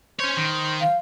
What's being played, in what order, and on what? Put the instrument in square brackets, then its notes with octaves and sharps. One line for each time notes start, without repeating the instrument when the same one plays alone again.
[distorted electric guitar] C#4 C#5 [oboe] C5
[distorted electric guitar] D#3
[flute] F5